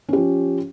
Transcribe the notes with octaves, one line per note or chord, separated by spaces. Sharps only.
F3 C#4 G4